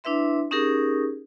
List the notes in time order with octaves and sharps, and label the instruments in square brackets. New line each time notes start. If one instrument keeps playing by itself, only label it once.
[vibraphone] D4 E4 B4 E5 C6
C#4 D#4 G4 G#4 A#4